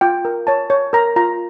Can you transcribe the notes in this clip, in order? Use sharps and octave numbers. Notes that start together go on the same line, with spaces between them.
F4 G5
A#4
C#5 A5
C#5
A#4 A#5
F4 A#5